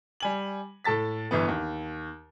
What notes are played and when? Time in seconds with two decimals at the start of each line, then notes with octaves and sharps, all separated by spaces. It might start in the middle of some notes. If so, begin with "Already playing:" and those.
0.20 G3 G#5 F#7
0.84 A2 A4 A5 A6 B6
1.31 G1 E3 B3
1.48 D#2